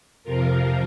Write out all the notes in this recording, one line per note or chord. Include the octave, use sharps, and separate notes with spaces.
F2 C3 F3 F4 A#4